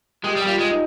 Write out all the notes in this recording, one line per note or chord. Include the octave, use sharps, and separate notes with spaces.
G#3 G4 G5
G3
G5
G3 F4 F5
G#3
D#4 D#5